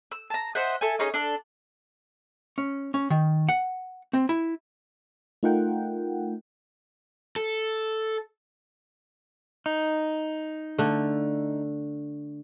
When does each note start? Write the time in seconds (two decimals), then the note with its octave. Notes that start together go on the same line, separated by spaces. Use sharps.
0.12 E6
0.30 A5 A#5
0.55 C5 D#5 E5 F#5
0.81 A4 E5 G#5
0.99 C#4 D#4 G#4 C#5
1.14 D4 A4
2.58 C#4
2.94 C#4
3.10 D#3
3.49 F#5
4.13 C4
4.29 E4
5.43 A3 D#4 F4 A#4 F#5 G5
7.36 A4
9.66 D#4
10.78 D3 A3